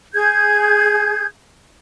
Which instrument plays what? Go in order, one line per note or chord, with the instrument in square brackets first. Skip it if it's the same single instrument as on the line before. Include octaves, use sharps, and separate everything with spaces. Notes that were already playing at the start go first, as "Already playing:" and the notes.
[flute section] G#4 G6 G#6